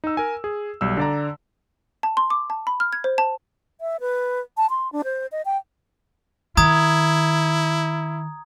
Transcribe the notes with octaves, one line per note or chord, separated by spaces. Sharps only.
D#4 E6
A#4 G#5
G#4
B1 G3 E6
D3 D5 A#5
A5
C6
D6
A5
B5
F6
G#6
C5
A5
E5
B4
A5
C6
D4
C5
D#5
G5
D#3 E4 A#5 D#6 G#6